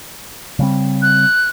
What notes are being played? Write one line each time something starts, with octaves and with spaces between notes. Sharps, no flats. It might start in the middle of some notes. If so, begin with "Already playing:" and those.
C#3 G3 C4
F#6